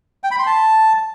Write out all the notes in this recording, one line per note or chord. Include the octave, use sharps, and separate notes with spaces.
G5
B5
C6
A5